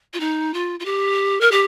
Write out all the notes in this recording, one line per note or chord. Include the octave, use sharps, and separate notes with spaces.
F4
D#4
F4
F4
G4
A#4
G4